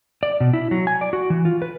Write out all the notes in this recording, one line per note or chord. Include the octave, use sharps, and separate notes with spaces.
D5
B2
E4
F#3
G#5
D5
F#4
E3
F4
B4